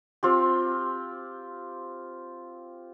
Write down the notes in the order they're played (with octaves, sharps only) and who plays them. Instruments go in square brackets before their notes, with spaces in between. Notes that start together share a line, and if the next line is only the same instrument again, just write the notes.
[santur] C4 F4 G4